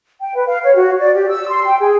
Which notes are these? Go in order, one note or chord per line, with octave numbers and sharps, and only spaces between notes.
G5
B4
F5
C#5
F#4
D5
G4
E6
C6
G5
G#4